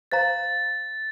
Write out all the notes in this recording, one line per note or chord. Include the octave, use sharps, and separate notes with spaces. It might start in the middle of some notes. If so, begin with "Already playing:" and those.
C5 F5 A#5 A6